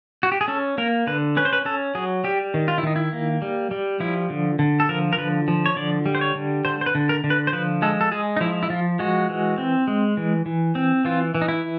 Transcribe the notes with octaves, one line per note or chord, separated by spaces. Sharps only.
F#4
G4
G#4
C#4 A4
A#3 A#4
D3 B4
C#4 B4
C5
B4
C#4 A4
F#3 G#4
G3 G4
D#3
F4
E4
D#3 D#4
E4
A#3
G3
G3
F3 E4
D3
D3
A4
F3 A#4
A#4
D3 B4
F3
C#5
D3 D5
G3
C5
C#5
D3
D3 C5
C5
B4
D3
A#4
D3
B4
C5
F3 B4
G#3 A4
A4
G#3 G#4
D#4
F3 E4
E4
F3 F4
G#3 F#4
E3
C4
G#3
E3
E3
C4
E3 F4
E3
D#4
E4